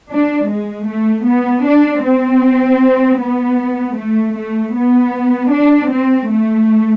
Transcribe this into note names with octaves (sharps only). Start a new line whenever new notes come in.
D4
G#3
A3
B3
D4
C4
B3
A3
A3
B3
D4
C4
A3